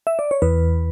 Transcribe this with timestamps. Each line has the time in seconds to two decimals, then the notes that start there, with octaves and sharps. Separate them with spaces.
0.07 E5
0.19 D5
0.31 C#5
0.42 E2 B4